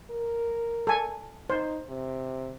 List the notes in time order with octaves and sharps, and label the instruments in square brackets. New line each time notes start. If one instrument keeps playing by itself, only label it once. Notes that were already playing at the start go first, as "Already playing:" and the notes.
[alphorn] A#4
[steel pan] A4 G#5
[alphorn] D#4 [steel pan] C5
[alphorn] C3